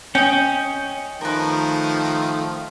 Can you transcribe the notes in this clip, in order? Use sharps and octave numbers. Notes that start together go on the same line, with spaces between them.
C#4 D#5 G5
D#3 F3 A3 A#4 B4